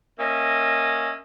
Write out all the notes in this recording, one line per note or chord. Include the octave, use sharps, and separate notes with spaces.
A#3 C#4 D#5 E5